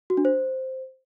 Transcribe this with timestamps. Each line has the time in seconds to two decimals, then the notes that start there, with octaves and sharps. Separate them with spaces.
0.10 F#4
0.17 D4
0.25 C5